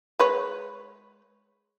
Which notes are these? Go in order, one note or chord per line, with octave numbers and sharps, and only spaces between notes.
G#3 B4 C#5